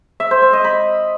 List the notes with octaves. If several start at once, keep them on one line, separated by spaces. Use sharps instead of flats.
E5
C5
C5
D#5
B5